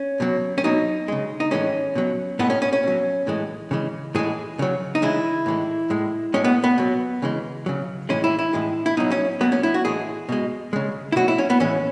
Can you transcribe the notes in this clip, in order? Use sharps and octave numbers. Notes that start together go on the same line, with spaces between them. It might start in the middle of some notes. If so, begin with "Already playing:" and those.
Already playing: C#4
B2 F#3
C#4
B2 F#3 D#4
C#3 G#3
D#4
A2 E3 G#3 C#4
B2 F#3
A2 G#3 B3
C#4
C#4
C#4
B2 F#3
A2 E3 G#3
C#3 E3 G#3
A2 E3 G#3 G#4
C#3 F#3
D#4
C#3 E3 G#3 E4
A2 E3 G#3
A2 G#3
A2 G#3 C#4
B3
B3
B2 F#3
C#3 E3 G#3
C#3 F#3
A2 E3 G#3 C#4
E4
E4
A2 E3 G#3
E4
B2 F#3 D#4
C#4
B2 F#3 B3
C#4
E4
F#4
A2 E3 G#3 G#4
B2 G#3
C#3 G#3
E4
B2 F#3 F#4
E4
C#4
B3
A2 E3 G#3 C#4